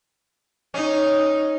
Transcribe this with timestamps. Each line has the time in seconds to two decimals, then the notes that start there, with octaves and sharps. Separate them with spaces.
0.74 C#4 D#4